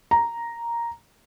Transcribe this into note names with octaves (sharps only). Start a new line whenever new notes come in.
A#5